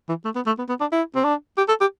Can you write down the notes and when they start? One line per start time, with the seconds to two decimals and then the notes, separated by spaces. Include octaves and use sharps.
0.09 E3
0.25 A3
0.35 B3
0.46 A3
0.58 B3
0.69 B3
0.80 D4
0.92 E4
1.15 C4
1.24 D4
1.57 G4
1.68 A4
1.81 G4